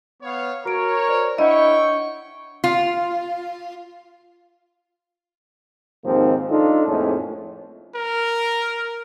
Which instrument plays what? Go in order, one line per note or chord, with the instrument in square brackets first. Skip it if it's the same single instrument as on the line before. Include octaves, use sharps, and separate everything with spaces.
[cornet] B3 [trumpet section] C#5 F5
[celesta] F#4 D7 [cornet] A#4 [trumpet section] C#5
[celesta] C5 D5 F6
[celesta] D4 F#5 [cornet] E4 [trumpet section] C#5 G5 C#6 [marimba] D#5
[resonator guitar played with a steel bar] F4
[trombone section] D#2 G#2 F3 A#3 C4
D4 D#4 F4 A4
F2 A2 G#3 A#3 C#4
[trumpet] A#4